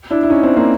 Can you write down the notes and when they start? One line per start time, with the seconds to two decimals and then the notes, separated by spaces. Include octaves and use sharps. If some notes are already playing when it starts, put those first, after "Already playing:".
0.11 D4 E4
0.23 E4
0.30 C#4 D#4
0.43 C4 D4
0.57 A#3 C4